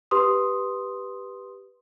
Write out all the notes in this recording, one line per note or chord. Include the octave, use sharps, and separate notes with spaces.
G4 B4 C6 D#6